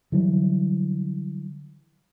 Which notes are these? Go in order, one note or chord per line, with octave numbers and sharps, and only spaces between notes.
D3 E3 F#3 G3